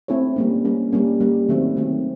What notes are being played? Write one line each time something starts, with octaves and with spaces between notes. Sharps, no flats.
A3 C4 E4 A4 C#5
G3 A#3 C#4
G3 A#3 C#4
G3 A#3 C#4
G3 A#3 C#4
D#3 F#3 A3 C4
D#3 F#3 A3 C4